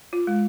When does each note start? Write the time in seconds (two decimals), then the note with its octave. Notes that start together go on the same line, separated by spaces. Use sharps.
0.13 F4
0.27 G#3